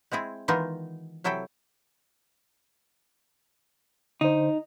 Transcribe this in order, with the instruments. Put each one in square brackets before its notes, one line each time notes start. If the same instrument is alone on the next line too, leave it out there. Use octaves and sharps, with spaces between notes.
[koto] G#3 C4 E4 G#4
D#3 E3 G#3 B3 D#4 F4
C3 F#3 E4 A4 G5
[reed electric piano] D3 C5 [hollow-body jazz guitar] D#4